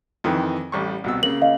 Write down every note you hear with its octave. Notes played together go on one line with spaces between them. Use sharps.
F2 D#3 E3
A1 G3 C#6
C2 B2 E6
C#3 A#3 F#7
D#5 F5